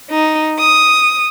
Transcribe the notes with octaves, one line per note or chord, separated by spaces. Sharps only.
D#4
D#6